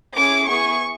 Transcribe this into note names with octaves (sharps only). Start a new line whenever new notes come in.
C#4 E4 G#4 D6
B3 E4 G#4 C#6